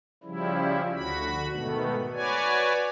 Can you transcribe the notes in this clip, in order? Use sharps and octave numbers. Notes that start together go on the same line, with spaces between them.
C#3 F3 G3 E4
D2 F#4 B5
G#2 B2 D#3 A3 B3
F#4 B4 C#5 D5 G#5